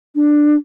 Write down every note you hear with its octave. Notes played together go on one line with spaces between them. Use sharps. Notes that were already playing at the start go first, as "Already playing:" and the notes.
D4